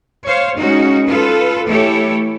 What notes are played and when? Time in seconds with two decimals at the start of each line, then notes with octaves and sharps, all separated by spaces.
0.24 C5 C#5 F5
0.57 G#3 C#4 D#4 F#4
1.06 F4 A4 B4
1.67 E3 A3 E4 G4 A4 C#5